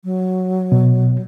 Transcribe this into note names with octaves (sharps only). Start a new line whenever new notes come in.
F#3
B2